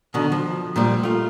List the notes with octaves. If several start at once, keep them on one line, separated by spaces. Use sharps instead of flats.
B2 D3 D#3
F3
A#2 F3 G3
A3 F4